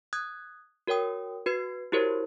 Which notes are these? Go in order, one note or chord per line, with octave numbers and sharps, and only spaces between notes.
D#6 F#6 G#6
F#4 A#4 C#5 G5 D#6
F#4 B4 G#6 C7
E4 F#4 G4 A#4 C5 C#5